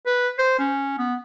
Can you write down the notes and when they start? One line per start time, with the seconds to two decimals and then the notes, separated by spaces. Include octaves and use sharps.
0.06 B4
0.39 C5
0.59 C#4
0.98 B3